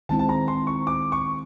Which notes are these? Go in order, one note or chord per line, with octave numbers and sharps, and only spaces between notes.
D#3 G#3 C4 E4 A5
A5
A#5
C6
C#6
D6
C#6